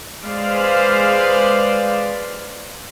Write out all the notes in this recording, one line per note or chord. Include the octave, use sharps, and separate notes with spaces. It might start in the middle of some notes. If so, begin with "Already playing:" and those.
G#3 B4 C5 D5 F5